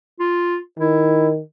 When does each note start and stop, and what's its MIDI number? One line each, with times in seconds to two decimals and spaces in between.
0.19 0.57 65
0.79 1.41 51
0.79 1.29 64